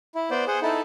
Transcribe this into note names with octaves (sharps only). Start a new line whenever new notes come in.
E4
B3 C5 D5
G#4 C5 F#5
D#4 E4 A4